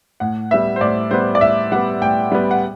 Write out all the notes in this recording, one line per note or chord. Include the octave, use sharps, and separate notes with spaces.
A2 F#5
G3 B3 E5
C5
A2 D5
G3 B3 C5
D5
A2 E5
G3 B3 F#5
A2 G5
G3 B3
F#5